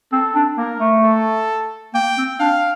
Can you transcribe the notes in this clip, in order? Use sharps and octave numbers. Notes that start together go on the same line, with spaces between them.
C4 A4
D4
A#3 A#4
A3
A4
A#3 G5
C4
D4 F5